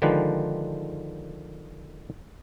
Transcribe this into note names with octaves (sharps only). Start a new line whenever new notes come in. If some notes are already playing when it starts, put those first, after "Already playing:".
D3 D#3 F3 G#3 G4 B4